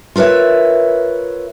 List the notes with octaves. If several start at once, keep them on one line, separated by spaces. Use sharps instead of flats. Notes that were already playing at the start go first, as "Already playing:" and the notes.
F4 A#4 B4 C#5 E5